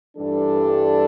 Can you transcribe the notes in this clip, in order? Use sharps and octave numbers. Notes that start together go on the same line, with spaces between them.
G2 E3 G3 D4 A4